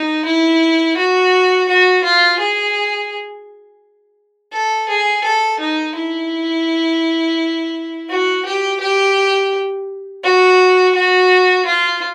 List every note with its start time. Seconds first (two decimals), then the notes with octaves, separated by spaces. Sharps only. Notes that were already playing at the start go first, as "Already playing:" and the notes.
Already playing: D#4
0.25 E4
0.97 F#4
1.69 F#4
2.04 F4
2.39 G#4
4.53 A4
4.89 G#4
5.24 A4
5.60 D#4
5.96 E4
8.09 F#4
8.45 G4
8.80 G4
10.24 F#4
10.95 F#4
11.65 F4